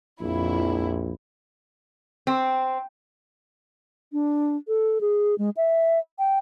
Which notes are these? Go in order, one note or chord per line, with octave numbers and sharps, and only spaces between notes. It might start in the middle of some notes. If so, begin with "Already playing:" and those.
A#1 F2 E4
C4
D4
A4
G#4
G#3
E5
G5